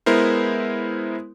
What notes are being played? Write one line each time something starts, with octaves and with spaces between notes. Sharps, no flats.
G#3 B3 E4 A#4 C5